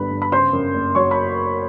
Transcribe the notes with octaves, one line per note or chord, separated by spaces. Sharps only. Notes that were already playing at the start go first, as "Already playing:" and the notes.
Already playing: G1 G2 D3 G3 B4 B5
G2
B5
C#3 C5 C6
F#2
F#1
F#3 C#5 C#6
B5